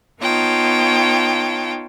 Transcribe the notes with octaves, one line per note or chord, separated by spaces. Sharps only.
B3 D#4 F4 C#5 G5 A5